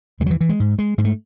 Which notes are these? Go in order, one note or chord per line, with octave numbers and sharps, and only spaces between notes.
E2 C#3 G#3
F#3
E3
E3
G#3
G#2
G#3
G#2 G#3
A3